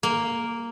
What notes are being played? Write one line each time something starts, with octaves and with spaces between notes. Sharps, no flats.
A#3